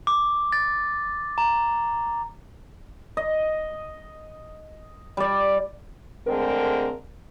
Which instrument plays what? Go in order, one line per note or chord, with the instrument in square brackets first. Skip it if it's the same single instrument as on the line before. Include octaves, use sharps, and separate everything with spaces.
[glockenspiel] D6
A6
A#5
[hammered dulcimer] D#5
G3 D5
[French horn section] D3 G#3 A3 C4 G#4 A#4